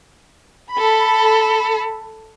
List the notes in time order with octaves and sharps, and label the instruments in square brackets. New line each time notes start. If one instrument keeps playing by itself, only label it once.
[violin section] A4 B5